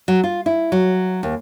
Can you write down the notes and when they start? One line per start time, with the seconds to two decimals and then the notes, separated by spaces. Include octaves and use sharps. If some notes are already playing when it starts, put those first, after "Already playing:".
0.08 F#3
0.24 F4
0.46 E4
0.72 F#3
1.23 D#2